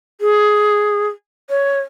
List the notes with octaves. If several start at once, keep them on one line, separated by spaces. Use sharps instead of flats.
G#4
C#5